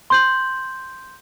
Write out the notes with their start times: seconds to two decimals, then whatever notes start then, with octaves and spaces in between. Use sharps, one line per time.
0.10 C6 G6 F#7